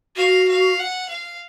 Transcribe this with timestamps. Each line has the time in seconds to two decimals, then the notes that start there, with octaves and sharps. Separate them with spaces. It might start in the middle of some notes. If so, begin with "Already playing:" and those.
0.16 F#4 F5
0.48 F5
0.79 F#5
1.09 F5